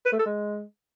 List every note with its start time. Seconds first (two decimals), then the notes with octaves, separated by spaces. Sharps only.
0.06 B4
0.12 A3
0.19 A4
0.26 G#3